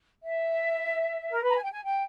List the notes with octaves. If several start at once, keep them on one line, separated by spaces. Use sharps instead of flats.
E5
A#4
B4
A#5
G#5
G5
G#5
G5